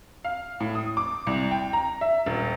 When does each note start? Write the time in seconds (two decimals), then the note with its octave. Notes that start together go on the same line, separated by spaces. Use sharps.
0.24 F5
0.60 A2
0.75 D#6
0.97 D6
1.27 C2
1.51 G5
1.73 A#5
2.01 E5
2.26 D#1